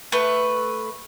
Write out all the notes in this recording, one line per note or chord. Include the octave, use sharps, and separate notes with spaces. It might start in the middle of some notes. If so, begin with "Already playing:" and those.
A3 B4